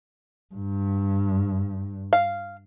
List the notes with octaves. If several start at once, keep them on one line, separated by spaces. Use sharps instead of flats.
G2
F5